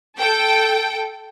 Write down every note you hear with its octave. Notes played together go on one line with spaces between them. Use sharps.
A4 G5